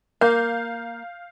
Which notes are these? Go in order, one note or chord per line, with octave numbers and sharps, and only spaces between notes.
A#3 F5 G6